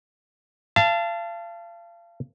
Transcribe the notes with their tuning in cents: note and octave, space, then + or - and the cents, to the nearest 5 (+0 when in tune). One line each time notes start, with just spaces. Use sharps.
F5 -35 A5 +0